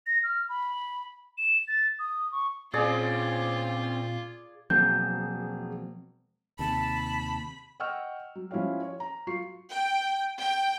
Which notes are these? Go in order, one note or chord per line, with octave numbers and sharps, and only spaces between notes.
A#6
F6
B5
E7
A6
D#6
C#6
A#2 C4 C#4 F4 G#4 D5
E1 F3 F#3 A#3 C4 G#4 G6
D#2 C3 A5 B5
D#5 F#5 G5 C#6 E6 F6
F#3
F3 C#4 E4 G4 C#5 F5
C#5
A#5
F#3 F4 C#6 C7
G5
G5